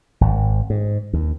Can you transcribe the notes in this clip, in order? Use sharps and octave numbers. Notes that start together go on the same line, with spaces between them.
G#1
G#2
D#2